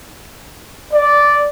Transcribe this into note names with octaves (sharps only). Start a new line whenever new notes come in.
D5